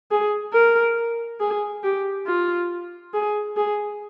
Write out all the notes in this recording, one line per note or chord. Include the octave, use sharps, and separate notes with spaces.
G#4
A#4
G#4
G4
F4
G#4
G#4